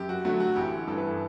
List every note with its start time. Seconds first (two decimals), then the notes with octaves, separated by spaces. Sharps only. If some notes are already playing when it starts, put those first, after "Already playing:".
Already playing: F#2 G4
0.09 F#4
0.25 D3 F#3 A3 F#4
0.40 F#4
0.56 A1 G4
0.87 G2 E3 A4
0.97 B4
1.06 A4